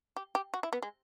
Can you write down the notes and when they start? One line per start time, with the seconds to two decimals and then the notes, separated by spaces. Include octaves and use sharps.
0.16 G4
0.35 G4
0.54 F#4
0.63 E4
0.73 B3
0.82 G#3